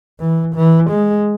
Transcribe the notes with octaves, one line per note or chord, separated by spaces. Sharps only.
E3
E3
G#3